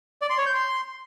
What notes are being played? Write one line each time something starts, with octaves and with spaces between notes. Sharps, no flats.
D5
C6
C#5
G6
C6